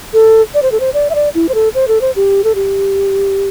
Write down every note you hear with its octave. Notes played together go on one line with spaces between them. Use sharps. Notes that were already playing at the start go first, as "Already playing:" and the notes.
A4
D5
C5
A4
C5
D5
E5
D5
E4
C5
A4
C5
A4
C5
G4
A4
G4